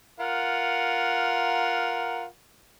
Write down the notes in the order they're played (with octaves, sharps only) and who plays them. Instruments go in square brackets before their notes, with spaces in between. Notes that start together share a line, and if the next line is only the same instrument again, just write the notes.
[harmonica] F4 A#4 F#5